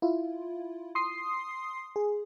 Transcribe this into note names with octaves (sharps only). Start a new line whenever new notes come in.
E4 F4
C6 D#6 C7
G#4